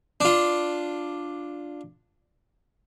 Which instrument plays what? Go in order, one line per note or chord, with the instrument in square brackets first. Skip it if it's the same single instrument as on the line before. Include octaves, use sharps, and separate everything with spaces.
[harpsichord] D4 F4